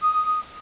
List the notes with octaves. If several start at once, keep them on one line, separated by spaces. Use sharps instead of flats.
D#6